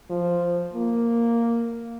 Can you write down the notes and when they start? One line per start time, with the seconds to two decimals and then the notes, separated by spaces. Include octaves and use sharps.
0.10 F3
0.73 A#3